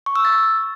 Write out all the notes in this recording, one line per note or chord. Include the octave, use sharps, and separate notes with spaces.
C#6
E6
A6